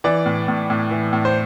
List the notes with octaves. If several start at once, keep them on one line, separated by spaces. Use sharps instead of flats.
E3 D5
A2
A2
A2
E3
A2
C5